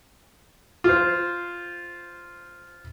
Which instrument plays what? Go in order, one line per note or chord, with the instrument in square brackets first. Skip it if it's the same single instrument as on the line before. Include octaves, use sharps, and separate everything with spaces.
[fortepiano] F4 C5